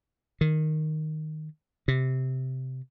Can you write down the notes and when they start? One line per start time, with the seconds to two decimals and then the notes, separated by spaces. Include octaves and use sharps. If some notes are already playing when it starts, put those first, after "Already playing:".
0.41 D#3
1.88 C3